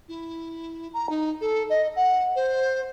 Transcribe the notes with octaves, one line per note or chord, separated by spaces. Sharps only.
E4
A#5
D#4
A4
D#5
F#5
C5